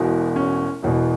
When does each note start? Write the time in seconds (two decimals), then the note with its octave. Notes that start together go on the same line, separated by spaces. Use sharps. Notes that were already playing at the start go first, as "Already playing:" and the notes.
Already playing: E1 E2 B2
0.36 C#4
0.82 E1 E2 B2